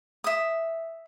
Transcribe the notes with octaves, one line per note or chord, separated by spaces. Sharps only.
E5 D#6